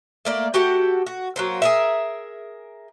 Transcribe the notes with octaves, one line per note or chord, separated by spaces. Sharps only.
A3 A#3 D5
F#4 G4 A4 F#5
F#4
F#3 A#3 C4
G#4 A#4 E5